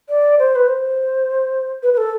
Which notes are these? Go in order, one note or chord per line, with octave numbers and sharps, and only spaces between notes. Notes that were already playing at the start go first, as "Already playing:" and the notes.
D5
C5
B4
C5
B4
B4
A4